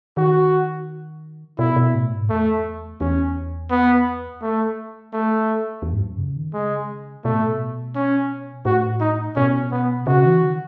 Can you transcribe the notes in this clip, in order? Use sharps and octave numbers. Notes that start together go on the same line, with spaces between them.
D#3 F#4
B2 E4
B2
A2
G#2
E2 A3
E2 C#4
B3
A3
A3
E2
G#2
F#2
C#3
D#3
C#3 G#3
B2 A3
A2
B2
C#4
A2 F#4
D#4
B2 C#4
B3
C#3 F#4
E3
D#3